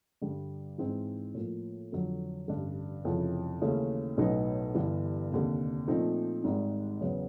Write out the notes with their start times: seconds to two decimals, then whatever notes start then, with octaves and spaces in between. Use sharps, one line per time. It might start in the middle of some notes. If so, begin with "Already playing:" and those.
0.22 G2 D3 G3
0.78 G#2 E3 G#3 C4
1.34 A2 F3 A#3
1.92 F2 D3 F#3
2.48 A1 G2 D3
3.04 F1 F2 C#3 E3
3.62 D#2 C#3 E3 A3 C#4
4.17 B1 A2 F#3 B3 D#4
4.75 G1 G2 E3
5.31 F1 D#2 D3
5.88 A#2 F3 A3 C4 D#4
6.44 G#1 G#2 D#3 G3
7.01 E2 C#3 F#3 B3